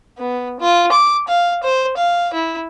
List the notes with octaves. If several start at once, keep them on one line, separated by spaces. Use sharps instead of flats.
B3
F4
D6
F5
C5
F5
E4